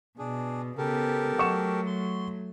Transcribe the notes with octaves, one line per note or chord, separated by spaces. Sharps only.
B2 D4 G#4
C#3 B3 G4 A4 A#4
F#3 A3 F#5 C#6 E7
C6